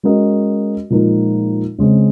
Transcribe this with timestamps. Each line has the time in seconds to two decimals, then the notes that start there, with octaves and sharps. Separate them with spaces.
0.03 G#3 C#4 F#4 A#4 D#5
0.90 A#2 F3 G#3 D#4 A#4
1.79 C#3 G#3 C4